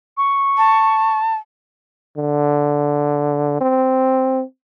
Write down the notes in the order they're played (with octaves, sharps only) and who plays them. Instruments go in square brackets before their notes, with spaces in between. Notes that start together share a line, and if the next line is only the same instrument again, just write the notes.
[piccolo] C#6
[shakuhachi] A5
[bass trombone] D3
C4